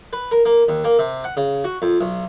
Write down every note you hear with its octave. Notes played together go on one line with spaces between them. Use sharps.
B4
A#4
A#3
D#2
A#3
C3
F#5
C#3
F#4
F2
B1